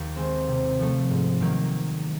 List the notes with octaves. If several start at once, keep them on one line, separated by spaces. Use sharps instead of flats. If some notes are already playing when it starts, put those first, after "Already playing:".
Already playing: D#2
D#3 G#3 C4
C3
F3 A3
G#2
D#3 F#3 A#3